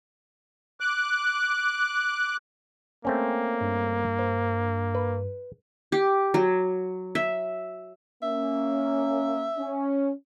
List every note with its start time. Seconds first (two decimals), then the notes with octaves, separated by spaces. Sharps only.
0.80 D6 F#6
3.05 A3 A#3 C4 C#4
3.60 G2
4.19 C5
4.95 B4
5.92 G4
6.34 F#3
7.15 E5
8.23 A#3 C#4 E5
9.57 C#4